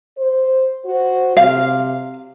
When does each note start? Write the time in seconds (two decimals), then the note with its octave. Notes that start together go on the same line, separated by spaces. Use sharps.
0.17 C5
0.84 F#4 C5
1.37 C3 F5